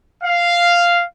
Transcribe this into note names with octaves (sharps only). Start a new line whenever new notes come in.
F5